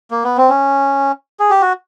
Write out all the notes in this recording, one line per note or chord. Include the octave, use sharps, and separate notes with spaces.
A#3
B3
C4
C#4
G#4
G4
F#4